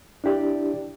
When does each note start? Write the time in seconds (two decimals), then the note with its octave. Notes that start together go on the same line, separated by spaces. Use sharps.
0.24 D4 E4 G4 D5